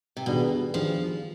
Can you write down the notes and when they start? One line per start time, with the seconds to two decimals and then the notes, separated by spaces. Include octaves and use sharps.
0.17 C3
0.26 B2 D#3 G3 D4 G#4
0.74 D#3 F3 G3 D4 G#4